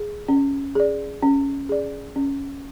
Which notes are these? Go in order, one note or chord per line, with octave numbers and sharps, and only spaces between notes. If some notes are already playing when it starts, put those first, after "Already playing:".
Already playing: G#4
C#4
G#4 D5
C#4
G#4 D5
C#4